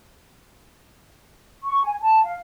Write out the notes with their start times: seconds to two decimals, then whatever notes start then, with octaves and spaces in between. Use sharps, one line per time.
1.64 C#6
1.84 G#5
2.01 A5
2.25 F5